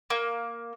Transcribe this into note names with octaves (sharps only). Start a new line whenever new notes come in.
A#3